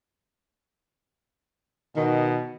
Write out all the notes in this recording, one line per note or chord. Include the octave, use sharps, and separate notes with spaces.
B2 D#3